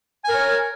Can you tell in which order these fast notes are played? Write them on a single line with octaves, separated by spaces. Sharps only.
G#5 A#4 C#5